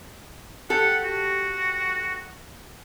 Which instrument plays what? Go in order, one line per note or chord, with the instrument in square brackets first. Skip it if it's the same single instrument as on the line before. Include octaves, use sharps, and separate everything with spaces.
[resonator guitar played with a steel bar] G4 A4 [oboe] F#5
[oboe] F#4